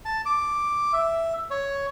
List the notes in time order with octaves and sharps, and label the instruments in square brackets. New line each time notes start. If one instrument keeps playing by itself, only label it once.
[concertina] A5
D6
E5
C#5